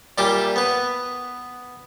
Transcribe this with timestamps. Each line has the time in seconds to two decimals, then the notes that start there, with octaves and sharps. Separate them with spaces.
0.18 A#2 G3 F4 G4 E5 D6
0.56 B3 B4